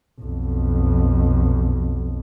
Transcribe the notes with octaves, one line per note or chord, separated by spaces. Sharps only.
B1 F2